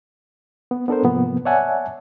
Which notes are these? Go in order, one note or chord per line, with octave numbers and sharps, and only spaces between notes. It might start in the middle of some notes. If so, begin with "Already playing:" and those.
B3
B3 D4 A4 A#4 C5
G#2 C3 F3 A#3 B3
C#5 D5 E5 F#5 G#5 A5